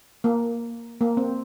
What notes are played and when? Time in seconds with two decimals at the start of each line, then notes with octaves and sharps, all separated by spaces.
0.24 A#3
1.01 A#3
1.17 C4